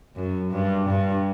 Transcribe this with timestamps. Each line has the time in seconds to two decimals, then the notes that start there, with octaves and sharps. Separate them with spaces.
0.16 F#2
0.51 G2
0.88 G2